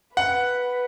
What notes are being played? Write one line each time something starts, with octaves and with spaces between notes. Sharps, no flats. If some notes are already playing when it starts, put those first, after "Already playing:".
B4 F#5